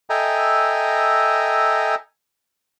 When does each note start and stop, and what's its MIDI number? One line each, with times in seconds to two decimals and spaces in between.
0.10 1.95 69
0.10 1.95 75
0.10 1.95 76
0.10 1.95 79
0.10 1.95 80
0.10 1.95 82